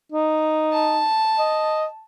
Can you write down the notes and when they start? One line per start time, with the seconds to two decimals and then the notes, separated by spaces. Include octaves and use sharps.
0.12 D#4
0.73 A5
1.39 D#5